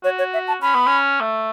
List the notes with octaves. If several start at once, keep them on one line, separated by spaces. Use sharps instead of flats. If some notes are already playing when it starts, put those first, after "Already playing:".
F#4 C#5
C#5
E5
A5
C#4 B5
B3
C#4
A3